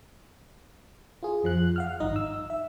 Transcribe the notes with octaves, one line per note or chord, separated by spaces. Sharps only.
F4 G#4
F2 F3 F#6
F5 F#5 F6
G#1 G2 D#4 D#5
E6
E5